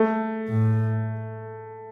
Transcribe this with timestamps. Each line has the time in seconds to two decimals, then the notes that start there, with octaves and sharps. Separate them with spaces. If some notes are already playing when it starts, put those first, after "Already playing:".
Already playing: A3
0.49 A2